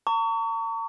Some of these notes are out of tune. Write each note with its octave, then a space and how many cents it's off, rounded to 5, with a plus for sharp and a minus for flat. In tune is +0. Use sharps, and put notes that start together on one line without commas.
A#5 -45 C#6 +30